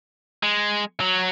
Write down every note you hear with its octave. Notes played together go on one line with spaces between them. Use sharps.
G#3
F#3